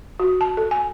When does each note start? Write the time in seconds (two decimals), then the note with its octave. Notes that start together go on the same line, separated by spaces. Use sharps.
0.20 F#4
0.41 A5
0.57 A4
0.71 G#5